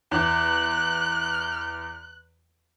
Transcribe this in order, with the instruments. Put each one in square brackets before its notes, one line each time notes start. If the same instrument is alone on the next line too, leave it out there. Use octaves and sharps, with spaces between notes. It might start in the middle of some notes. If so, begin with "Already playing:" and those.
[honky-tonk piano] E2 [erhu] F#6